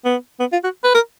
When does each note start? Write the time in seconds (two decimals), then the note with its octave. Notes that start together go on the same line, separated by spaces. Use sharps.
0.05 B3
0.40 B3
0.53 F4
0.64 F#4
0.84 B4
0.95 A#4